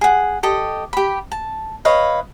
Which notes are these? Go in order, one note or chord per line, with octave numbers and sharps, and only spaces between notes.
G#4 F#5
G4 A4 D#5
G4 B5
A5
B4 C#5 D#5 F5